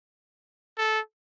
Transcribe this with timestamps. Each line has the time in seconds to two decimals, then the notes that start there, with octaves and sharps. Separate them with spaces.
0.78 A4